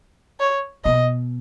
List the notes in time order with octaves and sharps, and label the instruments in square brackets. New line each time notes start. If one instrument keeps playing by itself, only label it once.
[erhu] C#5
[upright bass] B2 [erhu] D#5